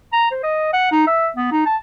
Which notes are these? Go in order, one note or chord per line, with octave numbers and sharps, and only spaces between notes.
A#5
C5
D#5
F#5
D#4
E5
B3
D#4
A5